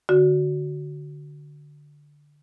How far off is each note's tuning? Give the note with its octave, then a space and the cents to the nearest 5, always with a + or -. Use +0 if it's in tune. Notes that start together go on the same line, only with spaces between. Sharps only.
D3 +0 F#4 +0